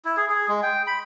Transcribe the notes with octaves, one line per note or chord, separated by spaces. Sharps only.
E4
G#4
G#4
G#3
G5
B5